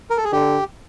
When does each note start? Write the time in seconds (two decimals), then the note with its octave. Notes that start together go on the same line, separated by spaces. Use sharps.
0.10 A#4
0.17 A4
0.24 G#4
0.32 D3 G4